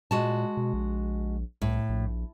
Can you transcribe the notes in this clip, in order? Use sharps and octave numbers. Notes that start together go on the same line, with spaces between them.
A#2 G#3 F#4 A5
B2
A#1
C2 A2
A#1